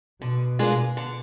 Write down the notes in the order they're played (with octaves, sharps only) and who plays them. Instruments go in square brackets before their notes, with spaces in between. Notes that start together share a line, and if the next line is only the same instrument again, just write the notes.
[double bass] B2 [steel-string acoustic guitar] D3
[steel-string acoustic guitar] G#3 D4 F4 A#4
D3